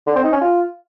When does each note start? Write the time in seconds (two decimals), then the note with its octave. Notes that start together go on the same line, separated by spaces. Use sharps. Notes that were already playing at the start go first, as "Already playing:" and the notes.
0.07 D3
0.15 C4
0.24 D#4
0.32 C#4
0.41 F4